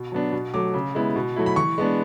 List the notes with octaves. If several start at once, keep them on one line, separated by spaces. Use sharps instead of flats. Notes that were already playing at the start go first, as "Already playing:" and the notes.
Already playing: B2
F#3 B3 D4
B2
F#3 A3 D6
C#3
G#3 B3 E4
B2
F#3 A3 E4
B5
E3 C#6
G#3 B3 D4